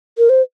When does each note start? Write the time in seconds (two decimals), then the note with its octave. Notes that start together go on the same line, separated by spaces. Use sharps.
0.18 A#4
0.29 C5